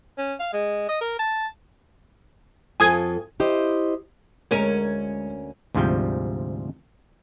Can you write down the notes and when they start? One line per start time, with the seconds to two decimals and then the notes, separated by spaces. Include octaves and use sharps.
0.18 C#4
0.40 F5
0.53 G#3
0.89 D#5
1.01 A#4
1.19 A5
2.80 F2 F4 A4 G#5 D#6 G#6
3.40 E4 G4 C5 D#5
4.51 D2 G#3 C#4 A#4 D#7
5.75 D2 G#2 C3 F3 G3 G5